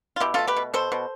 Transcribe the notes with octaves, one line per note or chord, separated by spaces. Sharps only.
F4
B2 E4 G4
A3 F4 A4
G4 B4
B2
B2 A4 C5
B2